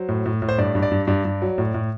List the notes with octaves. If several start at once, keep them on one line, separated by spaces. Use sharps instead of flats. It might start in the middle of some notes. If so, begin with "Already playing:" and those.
Already playing: F#3 C5
A2
A2
A2
C5
G2 D5
G2
D5
G2
G2 D5
G2
F#3
A2
A2